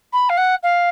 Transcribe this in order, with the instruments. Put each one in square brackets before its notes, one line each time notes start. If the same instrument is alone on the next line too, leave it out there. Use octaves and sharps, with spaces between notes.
[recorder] B5
F5
F#5
F5